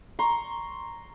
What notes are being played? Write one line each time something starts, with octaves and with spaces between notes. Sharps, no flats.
A#5 C6 C#6